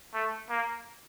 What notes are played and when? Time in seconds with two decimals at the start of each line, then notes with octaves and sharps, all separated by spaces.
0.14 A3
0.50 A#3